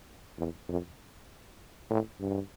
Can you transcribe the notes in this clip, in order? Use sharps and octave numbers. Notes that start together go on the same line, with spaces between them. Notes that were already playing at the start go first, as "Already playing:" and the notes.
E2
F2
A2
G2